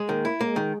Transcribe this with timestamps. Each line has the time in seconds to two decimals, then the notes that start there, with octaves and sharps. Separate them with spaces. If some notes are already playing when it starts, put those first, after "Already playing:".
Already playing: G#3
0.09 D#3 A#3
0.25 E4
0.41 G#3 A#3
0.56 D#3